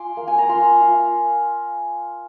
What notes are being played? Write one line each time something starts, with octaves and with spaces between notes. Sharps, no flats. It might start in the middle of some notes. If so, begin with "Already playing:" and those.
Already playing: F4 G#5 C6 D6
A#3
G#5
A#5
F4 C6
F4